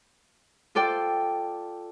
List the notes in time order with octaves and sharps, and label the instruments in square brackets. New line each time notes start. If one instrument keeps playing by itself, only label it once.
[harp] F4 A4 D5 G5